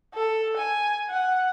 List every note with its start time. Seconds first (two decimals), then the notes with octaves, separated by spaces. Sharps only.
0.14 A4
0.57 G#5
1.09 F#5